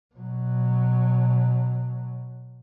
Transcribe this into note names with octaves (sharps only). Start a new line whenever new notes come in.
B2 F#3